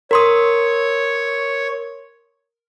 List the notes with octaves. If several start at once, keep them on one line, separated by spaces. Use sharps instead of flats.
A#4 C#5 C6 D#6